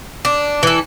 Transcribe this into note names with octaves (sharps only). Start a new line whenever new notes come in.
D4
E3 A4